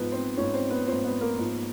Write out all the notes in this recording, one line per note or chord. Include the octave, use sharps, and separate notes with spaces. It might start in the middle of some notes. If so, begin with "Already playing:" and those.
Already playing: G#2 F3 B3 B4
C4 C5
G#2 F3 C#4 C#5
C4 C5
B3 B4
G#2 F3 C4 C5
B3 B4
A#3 A#4
G#2 F3